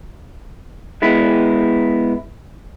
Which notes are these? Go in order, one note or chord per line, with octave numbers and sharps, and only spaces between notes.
G#3 B3 E4